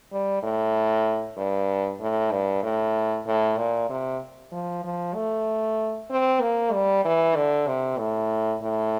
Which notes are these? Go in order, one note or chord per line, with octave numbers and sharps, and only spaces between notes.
G3
A2
G2
A2
G2
A2
A2
A#2
C3
F3
F3
A3
C4
A#3
G3
E3
D3
C3
A2
A2